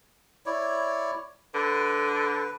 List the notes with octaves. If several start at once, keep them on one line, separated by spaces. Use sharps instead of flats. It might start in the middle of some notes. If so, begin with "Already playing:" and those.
E4 C#5 D5
D3 B4